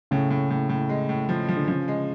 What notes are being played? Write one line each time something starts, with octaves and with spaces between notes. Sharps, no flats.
A2 C#3
A2
A2
A2
G#3
A2
F3
F3
D3
C#3 F3
G#3